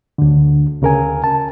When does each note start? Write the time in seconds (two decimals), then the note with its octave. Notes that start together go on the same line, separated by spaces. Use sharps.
0.18 D2 D3
0.81 D2 C#3 A#4 G#5
1.24 A5